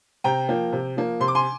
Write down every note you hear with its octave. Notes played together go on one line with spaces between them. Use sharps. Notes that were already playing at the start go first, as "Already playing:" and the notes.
C3 G5 A#5
F3 A#3
C3
F3 A#3
C3 C6
D6
G#5 C6